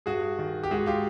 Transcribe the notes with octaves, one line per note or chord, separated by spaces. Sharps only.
G2 F#4 G#4
D#3
G4
G#2 F#4 G#4
F4 G4